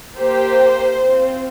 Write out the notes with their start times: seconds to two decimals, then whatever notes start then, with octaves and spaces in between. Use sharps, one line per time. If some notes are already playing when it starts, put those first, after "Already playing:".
0.18 A#3 G4 C5
1.02 C4 F4